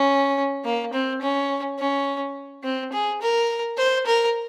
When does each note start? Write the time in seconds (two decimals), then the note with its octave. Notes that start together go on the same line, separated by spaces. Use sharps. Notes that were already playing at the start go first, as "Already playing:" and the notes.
Already playing: C#4
0.65 A#3
0.93 C4
1.22 C#4
1.79 C#4
2.63 C4
2.92 G#4
3.21 A#4
3.78 C5
4.06 A#4